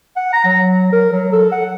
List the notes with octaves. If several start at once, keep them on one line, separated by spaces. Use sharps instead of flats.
F#5
A#5
F#3
A#4
F#3
A4
F#5